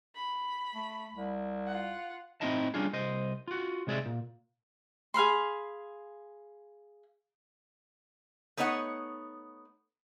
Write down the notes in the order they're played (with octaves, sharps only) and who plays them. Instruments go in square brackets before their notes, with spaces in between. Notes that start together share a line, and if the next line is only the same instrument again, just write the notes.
[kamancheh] B5
[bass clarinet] A3
C2
[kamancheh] F4 F#5
[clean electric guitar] A2 C4 D#4 E4 D#5 A5
G3 C#4 D4 F4 G#4
C2 C5 D#5
F4 F#4
C3 G#3 G#4 D5 E5
A#2
[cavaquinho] G#4 F5 B5 C6
[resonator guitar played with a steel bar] A3 B3 D#4 C#5 E5 F#5